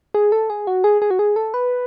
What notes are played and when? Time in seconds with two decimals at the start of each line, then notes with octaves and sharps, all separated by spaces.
0.14 G#4
0.32 A4
0.50 G#4
0.67 F#4
0.84 G#4
1.02 G#4
1.11 F#4
1.19 G#4
1.36 A4
1.54 B4